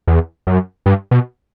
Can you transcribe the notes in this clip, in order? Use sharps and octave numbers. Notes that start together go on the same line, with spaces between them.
E2
F#2
G2
B2